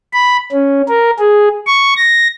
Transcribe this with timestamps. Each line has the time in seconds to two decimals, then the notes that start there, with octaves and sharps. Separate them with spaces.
0.13 B5
0.52 C#4
0.88 A#4
1.19 G#4
1.67 C#6
1.96 A#6